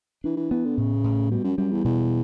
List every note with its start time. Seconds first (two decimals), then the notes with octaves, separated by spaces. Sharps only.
0.24 E3 D4
0.37 E3
0.51 E3 B3
0.65 D3
0.77 A2 C#3
1.04 A2
1.31 B2 G3
1.44 F#2
1.57 F#2 G3
1.71 E2
1.84 E2 B2